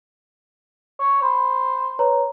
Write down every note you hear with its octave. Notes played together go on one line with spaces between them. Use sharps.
C#5
C5 B5
B4 C#5 A#5